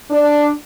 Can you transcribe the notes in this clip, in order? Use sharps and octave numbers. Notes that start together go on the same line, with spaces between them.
D4